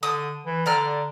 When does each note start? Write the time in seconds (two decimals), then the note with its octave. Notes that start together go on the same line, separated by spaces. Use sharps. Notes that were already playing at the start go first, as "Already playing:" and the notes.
0.03 D3 D#6
0.46 E3
0.66 D3 D5 A#5 F6